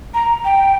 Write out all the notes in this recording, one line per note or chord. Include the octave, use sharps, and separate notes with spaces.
A#5
G5